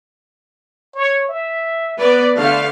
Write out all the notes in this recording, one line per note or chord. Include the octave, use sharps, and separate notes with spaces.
C#5
E5
B3 B4 D5
D3 A3 F5